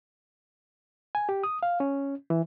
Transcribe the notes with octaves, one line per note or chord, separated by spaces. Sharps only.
G#5
G4
D#6
F5
C#4
E3